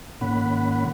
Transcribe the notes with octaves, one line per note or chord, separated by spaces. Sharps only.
G#2 D#3 A#3 C#4 F#5 B5